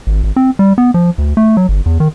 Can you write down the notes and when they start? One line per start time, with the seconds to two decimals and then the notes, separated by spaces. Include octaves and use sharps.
0.07 G#1
0.24 G#1
0.36 C4
0.59 G3
0.78 B3
0.94 F3
1.18 D2
1.37 A3
1.57 F#3
1.69 G1
1.86 E2
2.00 D#3